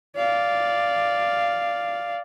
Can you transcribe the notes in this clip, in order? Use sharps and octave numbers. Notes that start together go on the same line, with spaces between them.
D5 F5